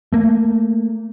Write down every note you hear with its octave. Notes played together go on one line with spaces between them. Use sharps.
A3 A#3